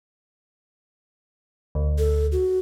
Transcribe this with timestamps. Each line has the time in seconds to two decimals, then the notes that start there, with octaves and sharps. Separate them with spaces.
1.75 D2
1.98 A4
2.32 F#4